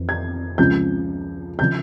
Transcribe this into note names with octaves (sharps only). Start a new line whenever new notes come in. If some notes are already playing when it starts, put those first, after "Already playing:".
Already playing: F2 E3
G#6
C#2 C#3 F3 G6
C#3 F3 G6